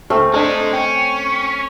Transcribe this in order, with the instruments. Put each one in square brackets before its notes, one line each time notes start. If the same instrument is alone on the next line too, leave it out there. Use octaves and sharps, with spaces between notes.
[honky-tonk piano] D2 F6 [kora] A3 C4
[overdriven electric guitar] G#3 D#4 [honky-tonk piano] D4 A4
[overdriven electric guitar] C#4 [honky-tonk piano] G5